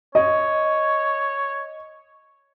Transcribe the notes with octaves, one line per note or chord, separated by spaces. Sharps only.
C#5 D#5